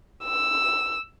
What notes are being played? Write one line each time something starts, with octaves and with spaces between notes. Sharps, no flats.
E6